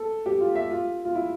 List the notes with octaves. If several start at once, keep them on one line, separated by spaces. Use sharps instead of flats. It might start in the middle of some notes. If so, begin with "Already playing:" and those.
Already playing: A4
G4
F4
E5
F4
F4
E4